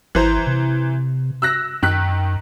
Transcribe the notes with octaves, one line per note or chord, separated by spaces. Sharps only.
G#1 E3 C5 A#5
C3
E6 F#6 A#6
F#2 D#3 F#6 B6